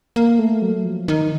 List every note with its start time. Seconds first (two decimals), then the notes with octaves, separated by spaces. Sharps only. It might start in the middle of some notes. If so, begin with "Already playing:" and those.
0.16 A#3
0.39 A3
0.62 F#3
0.85 F3
1.08 D#3